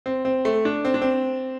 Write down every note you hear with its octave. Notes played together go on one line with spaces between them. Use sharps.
C4
C4
A3
D4
C4
D4
C4